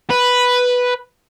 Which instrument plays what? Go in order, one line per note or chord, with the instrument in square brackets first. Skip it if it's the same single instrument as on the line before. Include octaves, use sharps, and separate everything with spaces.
[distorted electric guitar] B4